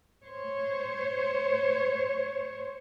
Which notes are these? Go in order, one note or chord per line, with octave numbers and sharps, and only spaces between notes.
C5 C#5